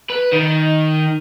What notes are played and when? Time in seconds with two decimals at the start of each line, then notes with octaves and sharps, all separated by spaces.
0.10 B4
0.32 D#3